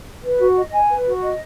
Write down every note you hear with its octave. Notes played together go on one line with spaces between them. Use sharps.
B4
F#4
D#5
G#5
B4
F#4
D#5